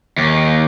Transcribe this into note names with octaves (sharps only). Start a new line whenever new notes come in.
D#2